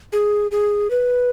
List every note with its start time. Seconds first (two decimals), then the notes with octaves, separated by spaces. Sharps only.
0.13 G#4
0.51 G#4
0.90 B4